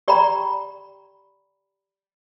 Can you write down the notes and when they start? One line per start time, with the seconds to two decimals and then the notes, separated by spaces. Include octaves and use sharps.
0.08 G4 D5 G5 A#5 B5